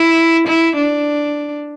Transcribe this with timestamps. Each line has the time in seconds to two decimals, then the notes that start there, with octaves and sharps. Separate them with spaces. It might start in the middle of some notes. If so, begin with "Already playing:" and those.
Already playing: E4
0.48 E4
0.76 D4